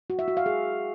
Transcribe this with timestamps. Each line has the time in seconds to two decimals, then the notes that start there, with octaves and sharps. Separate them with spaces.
0.10 F#4
0.19 E5
0.28 F#4
0.37 F5
0.46 G#4